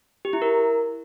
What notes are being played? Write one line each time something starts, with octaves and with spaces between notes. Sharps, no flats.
G4
E4
A#4